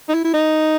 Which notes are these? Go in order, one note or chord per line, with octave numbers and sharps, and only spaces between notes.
D#4
E4
E4
D#4